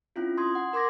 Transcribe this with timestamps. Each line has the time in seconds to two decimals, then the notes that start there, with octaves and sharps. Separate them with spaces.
0.16 C4 C#4 E4 F4
0.37 C6 D#6 G#6
0.55 F#5
0.73 A#4 C6 D6 G#6 A#6